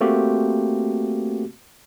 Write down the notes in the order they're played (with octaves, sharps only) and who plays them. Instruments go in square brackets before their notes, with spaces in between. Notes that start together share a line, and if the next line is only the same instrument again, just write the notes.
[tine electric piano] A3 A#3 C4 F#4 G4